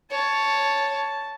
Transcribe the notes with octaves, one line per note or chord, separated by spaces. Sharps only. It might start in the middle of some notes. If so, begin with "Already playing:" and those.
C#5 A5